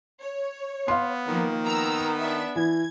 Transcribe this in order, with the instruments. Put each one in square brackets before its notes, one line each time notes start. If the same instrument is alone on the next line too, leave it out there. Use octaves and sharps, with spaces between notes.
[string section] C#5
[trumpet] B3 [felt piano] F5 C6
[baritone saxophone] D#3 [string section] F3 A#3
[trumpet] B3 [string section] A#5 E6
[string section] D4 E5
[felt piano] E3 [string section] G#6